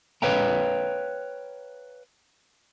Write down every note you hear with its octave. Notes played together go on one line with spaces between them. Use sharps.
B4 C#5 F5 G5 A#5